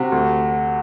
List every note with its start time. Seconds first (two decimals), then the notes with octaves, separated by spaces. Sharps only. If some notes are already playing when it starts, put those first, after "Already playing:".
Already playing: C3 F#4
0.12 D2